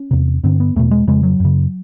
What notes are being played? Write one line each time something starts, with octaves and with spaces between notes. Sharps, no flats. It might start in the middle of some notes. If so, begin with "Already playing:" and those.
Already playing: C#4
E2 C3
G2 D3 C4
B3
E2 B2 A3
G#3
F2 C#3 G#3
F#3
F#2 C#3